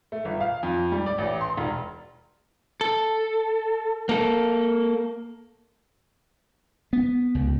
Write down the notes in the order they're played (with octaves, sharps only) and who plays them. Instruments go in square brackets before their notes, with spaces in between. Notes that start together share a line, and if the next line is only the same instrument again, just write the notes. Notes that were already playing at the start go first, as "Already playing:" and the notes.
[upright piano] A3
G1
F5
F2
G3
D5
A1
C6
E1
[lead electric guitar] A4
A#3 A4
[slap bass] B3
C#2